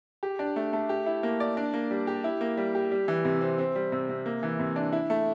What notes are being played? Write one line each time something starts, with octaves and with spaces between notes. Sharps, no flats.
G4
D4
A3
A3
G4
E4
A#3
D5
D4
A#3
G3
G4
E4
A#3
G3
G4
G3
E3
C3
C4
C4
G3
C3
C3
A#3
E3
C3
D4
E4
A3